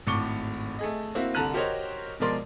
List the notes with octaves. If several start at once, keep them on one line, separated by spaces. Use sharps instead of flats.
G#1 A2 C#6 D6 C#7 G7
A3 G#4 D#5
A#3 C4 E4 F#4
C2 D3 A5 A#5 F#6 D#7
F#4 G4 A#4 C5 C#5 D#5
B2 F3 G#3 A#4 D5 C6